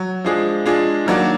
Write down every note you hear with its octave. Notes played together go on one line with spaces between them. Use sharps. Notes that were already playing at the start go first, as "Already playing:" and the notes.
Already playing: F#3
F3 G#3 D4 G#4
G#3 D4 F4 G#4
D#3 F#3 A#3 D4 F#4